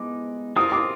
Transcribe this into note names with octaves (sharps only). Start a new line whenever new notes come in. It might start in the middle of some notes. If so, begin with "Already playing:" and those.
Already playing: G#3 B3 D#4 D6
C4 F4 A#4 D#6
D6